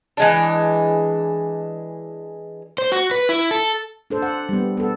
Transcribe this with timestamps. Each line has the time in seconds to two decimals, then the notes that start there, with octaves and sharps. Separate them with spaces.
0.17 E3 G#3 D4
2.78 C5
2.92 F#4
3.11 B4
3.29 E4
3.51 A4
4.10 D4 A4 C5
4.22 F#5
4.49 G3 B3
4.77 B3 A4